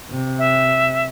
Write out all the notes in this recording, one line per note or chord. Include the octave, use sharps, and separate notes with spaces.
C3
E5